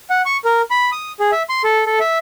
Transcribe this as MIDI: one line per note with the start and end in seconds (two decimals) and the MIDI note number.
0.10 0.22 78
0.26 0.37 85
0.45 0.62 70
0.71 0.90 83
0.92 1.12 87
1.20 1.31 68
1.32 1.43 76
1.49 1.62 84
1.64 1.85 69
1.86 1.99 69
2.00 2.18 76